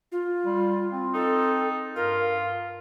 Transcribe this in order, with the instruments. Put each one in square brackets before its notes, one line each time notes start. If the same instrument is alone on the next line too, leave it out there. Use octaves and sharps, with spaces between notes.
[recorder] F4
[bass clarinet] G3
C4
[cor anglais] D#4 [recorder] A4
[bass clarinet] G2 [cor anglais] F4 [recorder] A#4